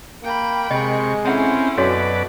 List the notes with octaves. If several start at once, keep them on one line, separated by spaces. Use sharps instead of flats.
A#3 G5 B5
C3 G#3 D#5 C#6
C4 C#4 E4 A4 F#5 A#5
F#2 B2 F#4 A4 B4 C#5 D5